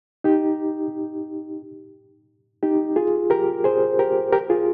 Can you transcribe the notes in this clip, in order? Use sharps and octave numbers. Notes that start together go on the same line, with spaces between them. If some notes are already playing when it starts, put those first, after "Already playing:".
D#4 G4
D#4 G4
F4 G#4
G4 A#4
G#4 C5
G4 A#4
G4 A#4
F4 G#4